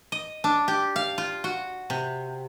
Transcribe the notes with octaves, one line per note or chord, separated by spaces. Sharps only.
D#5
D4
G4
F5
F4
F#4
C3